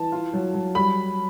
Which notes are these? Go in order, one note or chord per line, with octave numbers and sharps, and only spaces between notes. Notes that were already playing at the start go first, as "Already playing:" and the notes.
Already playing: E3 A5
F4
F#3
F#3
G3 B5